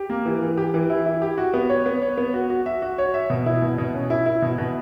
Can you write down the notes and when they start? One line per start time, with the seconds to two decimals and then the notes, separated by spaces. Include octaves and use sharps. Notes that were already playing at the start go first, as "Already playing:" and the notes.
Already playing: G4
0.09 A#3
0.26 E3
0.42 E3
0.57 G4
0.74 E3
0.90 E4
1.06 E4
1.22 G4
1.38 F#4
1.54 B3
1.69 C#5
1.86 B3
2.02 C#5
2.18 B3
2.34 F#4
2.50 F#4
2.66 E5
2.82 F#4
2.98 C#5
3.14 E5
3.30 B2
3.46 E4
3.62 B2
3.78 B2
3.94 C#4
4.10 E4
4.26 E4
4.42 B2
4.58 B2